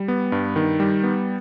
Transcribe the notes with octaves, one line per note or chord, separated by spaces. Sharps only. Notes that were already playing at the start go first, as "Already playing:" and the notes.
Already playing: G3
B3
G2
D#3
G3
B3